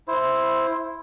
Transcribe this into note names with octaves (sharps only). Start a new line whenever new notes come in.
E4 C5